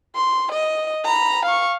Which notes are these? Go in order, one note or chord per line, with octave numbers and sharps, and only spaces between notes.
C6
D#5
A#5 B5
F5 C#6